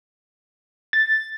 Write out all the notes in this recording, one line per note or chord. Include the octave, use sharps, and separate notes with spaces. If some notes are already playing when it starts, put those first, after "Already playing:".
A6